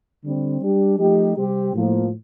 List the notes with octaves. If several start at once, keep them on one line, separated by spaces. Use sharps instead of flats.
D3 G3 C4
G3 D4 G4
F3 A3 D#4 G4
C3 G3 C4 G4
A2 F3 A#3